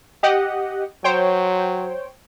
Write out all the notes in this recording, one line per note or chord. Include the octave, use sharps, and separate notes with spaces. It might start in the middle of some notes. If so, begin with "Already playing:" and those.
G4 D#5 F#5
F#3 C5 C#5 G5